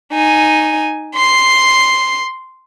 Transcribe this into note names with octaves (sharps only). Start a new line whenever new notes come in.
D#4 G#5
C6 C7